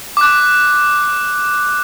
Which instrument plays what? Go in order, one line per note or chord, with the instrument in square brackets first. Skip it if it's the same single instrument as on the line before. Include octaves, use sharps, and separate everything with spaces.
[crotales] D6 F#6